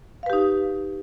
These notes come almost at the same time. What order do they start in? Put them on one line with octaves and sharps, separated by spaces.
F5 B4 G4 D#4